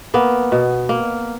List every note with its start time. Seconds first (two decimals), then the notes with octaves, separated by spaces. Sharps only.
0.14 A#3 B3
0.52 B2
0.89 A#3